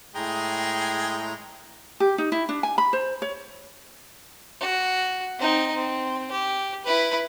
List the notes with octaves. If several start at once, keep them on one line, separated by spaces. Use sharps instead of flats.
A2 G#3 G#4 G5 A#5
G4
D#4
E4
D4
G#5
B5
C5
C#5
F#4
C4 D#4
C4
G4
E4 B4